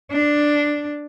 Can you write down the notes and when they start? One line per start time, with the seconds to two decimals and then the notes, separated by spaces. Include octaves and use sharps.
0.12 D4